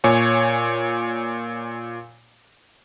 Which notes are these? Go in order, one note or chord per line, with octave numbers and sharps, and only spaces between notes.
A#2 C#5 G#5